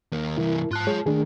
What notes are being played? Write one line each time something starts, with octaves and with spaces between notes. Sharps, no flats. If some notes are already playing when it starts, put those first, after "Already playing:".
D#2 A#3
C2 E3 E4 A#4
G#2 F4 A5 F#6
G#3 G#4 C#5
D#3 E3 A3 D4 G#4